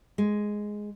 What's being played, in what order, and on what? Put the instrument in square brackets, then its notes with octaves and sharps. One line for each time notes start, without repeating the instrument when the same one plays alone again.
[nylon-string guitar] G#3